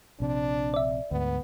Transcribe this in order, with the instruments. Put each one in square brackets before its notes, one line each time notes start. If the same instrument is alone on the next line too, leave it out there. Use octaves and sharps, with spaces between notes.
[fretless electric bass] A#1 C3 [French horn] D4
[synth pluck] D5 E5
[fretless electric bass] D2 G#2 [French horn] B3